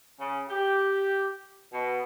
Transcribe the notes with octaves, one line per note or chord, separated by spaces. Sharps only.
C#3
G4
B2